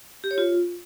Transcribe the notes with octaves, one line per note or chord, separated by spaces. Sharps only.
G4
C#5
F4